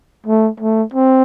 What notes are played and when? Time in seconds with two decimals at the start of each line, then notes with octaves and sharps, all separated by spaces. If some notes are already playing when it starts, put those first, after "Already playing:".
0.27 A3
0.60 A3
0.94 C4